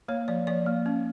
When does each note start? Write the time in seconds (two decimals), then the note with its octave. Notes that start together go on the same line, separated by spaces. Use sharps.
0.08 A#3 C#5
0.28 F3 D5
0.47 F3 D5
0.66 A#3
0.86 C#4